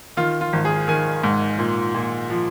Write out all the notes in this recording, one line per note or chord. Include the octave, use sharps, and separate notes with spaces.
D#3 F4
F4
G#1
G#4
D#3 G#5
G#2
A#2
A#2
F3